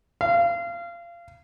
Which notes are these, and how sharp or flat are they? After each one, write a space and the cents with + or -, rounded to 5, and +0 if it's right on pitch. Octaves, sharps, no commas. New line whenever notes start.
F5 -25